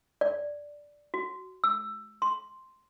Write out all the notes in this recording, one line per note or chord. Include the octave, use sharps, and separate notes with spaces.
D5
F#4
E6
C6